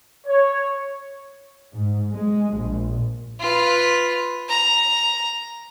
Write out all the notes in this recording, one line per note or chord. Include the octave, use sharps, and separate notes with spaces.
C#5
G#2
G#3
A#1
F4 B4
A#5